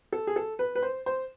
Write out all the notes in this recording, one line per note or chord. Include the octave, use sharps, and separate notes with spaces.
A4
G#4
A4
B4
B4
C5
C5